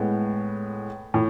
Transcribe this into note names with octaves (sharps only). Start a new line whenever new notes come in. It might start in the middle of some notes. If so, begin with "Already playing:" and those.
Already playing: A2 G#3 B3
A2